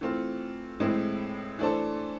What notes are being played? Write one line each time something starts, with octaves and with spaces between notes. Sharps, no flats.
E3 A3 C4 F4
A2 E3 G#3 C4 E4
E3 A3 D4 A4 C5